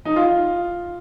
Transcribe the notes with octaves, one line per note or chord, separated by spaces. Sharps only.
D#4
F4